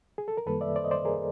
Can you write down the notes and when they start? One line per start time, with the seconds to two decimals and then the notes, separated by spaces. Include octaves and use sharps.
0.18 G#4
0.28 A4
0.37 A#4
0.46 F#2 D#3 G3 A#3 A4 B4
0.61 D5 E5
0.76 C5 D5
0.85 D#5
0.91 C5 D5
1.05 G#4 A#4